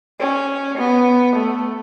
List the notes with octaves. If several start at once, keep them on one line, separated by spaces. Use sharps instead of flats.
C#4
B3
A3